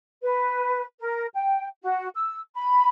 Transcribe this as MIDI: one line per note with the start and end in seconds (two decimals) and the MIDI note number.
0.22 0.85 71
0.99 1.26 70
1.35 1.67 79
1.83 2.08 66
2.14 2.40 88
2.55 2.89 83